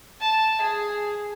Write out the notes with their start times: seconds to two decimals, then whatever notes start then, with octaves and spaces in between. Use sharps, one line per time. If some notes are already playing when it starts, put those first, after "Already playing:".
0.21 A5
0.61 G#4